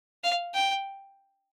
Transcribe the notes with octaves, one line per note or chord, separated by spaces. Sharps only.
F5
G5